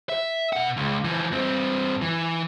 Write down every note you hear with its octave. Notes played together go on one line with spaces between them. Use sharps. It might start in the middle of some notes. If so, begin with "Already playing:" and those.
E5
B2 F#5
C#2
E3 F3
G2 C4
E3